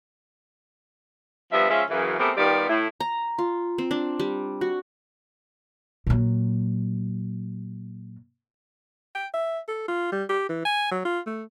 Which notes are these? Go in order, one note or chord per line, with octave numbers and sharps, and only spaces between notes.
F3 G3 B3 D4 E5
F3 G#3 C#4 F4 E5
F#2 C#3 E3
A3 B3 C4 G4 G#4 A#4
D#3 G3 B3 F4 G4 D5
A2 E4
A#5
F4
C4
D4
G3
F#4
A#2 F#3
G5
E5
A4
F4
G3
G4
E3
G#5
F#3
F4
A3